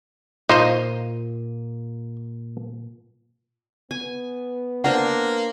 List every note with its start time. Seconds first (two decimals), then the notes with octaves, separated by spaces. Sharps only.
0.49 A#2 D#4 F4 C5 D#5 D#7
3.91 B3 G#5
4.84 A#3 D4 A#4 C5 F#5